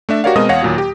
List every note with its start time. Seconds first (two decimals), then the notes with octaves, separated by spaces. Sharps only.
0.09 A3 D4 E5
0.24 F#4 G4 A#4 C#5 D5 F5
0.36 B2 G#3 C4 A#4 D#5 D#6
0.49 E2 C#5 F5 F#5 A#6
0.62 D#2 A#2 F#3
0.78 G4